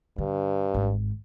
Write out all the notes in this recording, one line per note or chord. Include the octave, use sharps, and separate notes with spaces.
G2 D3
G#1